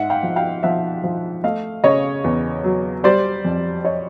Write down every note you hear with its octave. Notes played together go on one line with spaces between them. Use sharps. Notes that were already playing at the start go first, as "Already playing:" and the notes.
Already playing: G#2 E5 F#5
F5 G5
F3
F5 G5
F3 E5 F#5
F3
A3 D#5 F5
C#3 C#5 D#5
E2
F#3
G3 C5 D5
F2
C#5 D#5